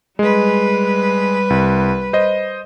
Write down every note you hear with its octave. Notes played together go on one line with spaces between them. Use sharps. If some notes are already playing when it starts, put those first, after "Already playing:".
G3 G#3 B4
C2
C5 D#5